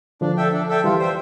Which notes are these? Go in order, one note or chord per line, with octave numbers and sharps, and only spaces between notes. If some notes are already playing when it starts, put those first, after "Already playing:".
D3 F3 D4
A4 E5 G5
D4
A4 E5 G5
E3 G3 F4
C5 E5 G5